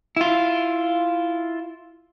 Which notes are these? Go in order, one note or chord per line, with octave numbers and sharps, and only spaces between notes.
E4 F4